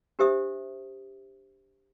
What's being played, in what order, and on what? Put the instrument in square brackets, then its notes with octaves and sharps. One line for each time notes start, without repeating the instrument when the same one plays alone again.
[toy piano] D4 G4 C5 E5 D#6